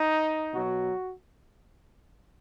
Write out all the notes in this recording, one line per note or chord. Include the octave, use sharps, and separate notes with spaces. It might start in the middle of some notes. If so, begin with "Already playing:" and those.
Already playing: D#4
B2 F#3 F#4